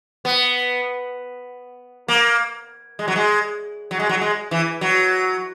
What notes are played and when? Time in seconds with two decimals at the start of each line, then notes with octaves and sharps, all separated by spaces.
0.25 B3
2.08 A#3
2.99 G#3
3.08 F#3
3.16 G#3
3.91 F#3
4.00 G#3
4.09 F#3
4.21 G#3
4.51 E3
4.81 F#3